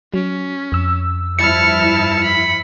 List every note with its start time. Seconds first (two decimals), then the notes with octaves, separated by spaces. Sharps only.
0.14 F#3 C#4
0.72 F2 E6
1.39 G2 F3 E4 A5 F6 C#7
2.24 B5